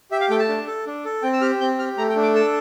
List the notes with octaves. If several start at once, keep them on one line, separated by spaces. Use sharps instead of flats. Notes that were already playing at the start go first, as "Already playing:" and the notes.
G4 E5
F5
A3 G5
A5
D4
A4
D4
A4
C4 G5
E6
G4 F6
C4 G6
G4 F6
A3 A#5
G5
D4
D6
A4 E6